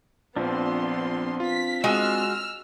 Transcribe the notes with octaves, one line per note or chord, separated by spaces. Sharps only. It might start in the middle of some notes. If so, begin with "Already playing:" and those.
A#1 F3 B3 C4 D4 C6
F4 B6
G#3 F#4 D#5 E6 F6